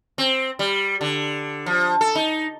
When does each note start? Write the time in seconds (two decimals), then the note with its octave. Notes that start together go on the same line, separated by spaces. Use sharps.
0.18 C4
0.59 G3
1.01 D3
1.66 F3
2.01 A4
2.15 D#4